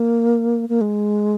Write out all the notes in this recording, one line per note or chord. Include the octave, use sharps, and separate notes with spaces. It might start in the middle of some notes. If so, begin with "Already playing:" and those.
Already playing: A#3
A#3
G#3